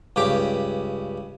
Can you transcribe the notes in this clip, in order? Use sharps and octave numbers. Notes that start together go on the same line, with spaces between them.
C#2 G2 G4 D6